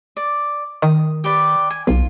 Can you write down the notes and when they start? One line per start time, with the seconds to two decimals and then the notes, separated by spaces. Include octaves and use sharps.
0.17 D5
0.82 D#3 D#6
1.24 G4 B4 D5
1.70 G#5
1.87 B1 F4